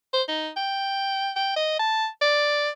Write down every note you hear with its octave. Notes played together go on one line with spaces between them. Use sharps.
C5
D#4
G5
G5
D#5
A5
D5